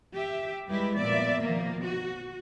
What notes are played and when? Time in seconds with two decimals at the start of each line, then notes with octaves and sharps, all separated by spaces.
0.14 G4 E5
0.68 G3 G#3 E4 G4 B4
0.97 A#2 F3 B3 D5 E5
1.42 B2 D#3 F3 A#3
1.86 F#4